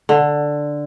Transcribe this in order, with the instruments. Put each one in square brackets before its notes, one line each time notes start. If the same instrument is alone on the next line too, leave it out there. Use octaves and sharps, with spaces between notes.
[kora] D3